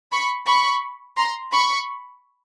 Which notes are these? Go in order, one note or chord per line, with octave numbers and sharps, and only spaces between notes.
B5 C#6
B5 C#6
A#5 C6
B5 C#6